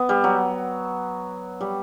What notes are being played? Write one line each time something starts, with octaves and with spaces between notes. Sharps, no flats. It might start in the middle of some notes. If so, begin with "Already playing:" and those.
Already playing: B3
G3
F#3
G3